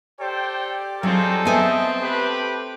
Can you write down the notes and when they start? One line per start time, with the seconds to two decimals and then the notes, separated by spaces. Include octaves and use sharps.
0.20 G4 A4 C5 D5 G5
1.03 F#3 C4 D#4 F4 G#4 A4
1.45 A3 B3 C4 D#5 E5 G#5
2.03 G4 B4 D6